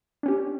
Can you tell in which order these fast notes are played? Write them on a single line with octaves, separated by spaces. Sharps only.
D4 C#4 G4